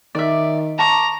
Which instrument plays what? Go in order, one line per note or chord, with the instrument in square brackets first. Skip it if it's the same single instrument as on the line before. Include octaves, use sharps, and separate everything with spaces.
[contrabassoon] D#3 [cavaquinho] D5 E5
[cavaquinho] A5 C#6 D6 [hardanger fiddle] A#5